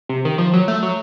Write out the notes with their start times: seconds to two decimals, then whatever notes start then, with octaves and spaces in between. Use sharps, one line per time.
0.09 C3
0.25 D#3
0.38 F3
0.53 F#3
0.68 A3
0.83 F#3